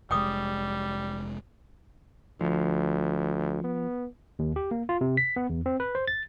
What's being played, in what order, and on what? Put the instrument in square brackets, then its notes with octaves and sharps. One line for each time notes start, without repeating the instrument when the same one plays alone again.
[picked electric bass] F1 G#3 [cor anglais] G3 [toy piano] G5 D6 D#6
[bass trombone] D2 [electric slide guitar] F3
[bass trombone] B3
[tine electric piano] D#2
G4
A#3
F4
C3
B6
B3
E2
C4
B4
C5
A6